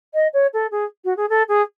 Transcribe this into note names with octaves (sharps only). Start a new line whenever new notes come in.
D#5
C#5
A4
G#4
F#4
G#4
A4
G#4